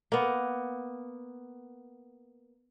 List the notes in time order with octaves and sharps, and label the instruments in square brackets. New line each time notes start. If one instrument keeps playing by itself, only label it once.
[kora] A#3 B3